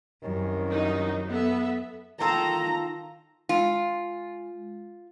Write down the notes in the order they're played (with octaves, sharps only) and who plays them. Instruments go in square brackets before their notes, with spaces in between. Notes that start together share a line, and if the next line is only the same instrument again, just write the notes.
[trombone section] C2 D#3 C#4 [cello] F#2
[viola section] D#4 F#4
B3 A4 E5
[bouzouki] D#3 F4 A4 [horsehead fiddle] A#5
[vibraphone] G#3 [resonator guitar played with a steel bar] F4